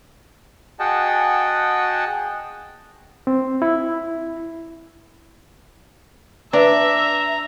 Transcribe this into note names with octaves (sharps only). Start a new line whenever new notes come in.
F#4 G#4 D#5 F#5 G5 A5
C4
E4
D4 B4 E5 A#5